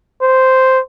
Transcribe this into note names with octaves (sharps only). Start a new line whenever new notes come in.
C5